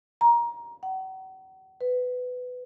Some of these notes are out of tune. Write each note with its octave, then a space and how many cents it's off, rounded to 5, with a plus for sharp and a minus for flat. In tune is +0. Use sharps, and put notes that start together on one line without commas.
A#5 +15
F#5 +40
B4 +20